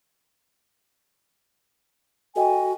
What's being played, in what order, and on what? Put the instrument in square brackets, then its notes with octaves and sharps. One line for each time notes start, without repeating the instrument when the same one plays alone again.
[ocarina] F#4 [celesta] A4 D#5 G5 [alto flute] G#5